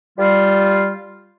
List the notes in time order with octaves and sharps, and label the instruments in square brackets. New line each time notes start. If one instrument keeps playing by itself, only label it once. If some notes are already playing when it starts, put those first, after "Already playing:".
[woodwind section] G3 F4